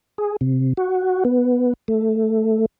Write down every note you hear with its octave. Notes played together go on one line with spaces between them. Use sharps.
G#4
C3
F#4
B3
A3